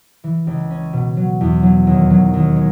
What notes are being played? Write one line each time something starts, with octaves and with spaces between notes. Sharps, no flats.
E3
C#2
C#4
B2
F#3
E2
F#3
D#2
F#3
D#2
G#3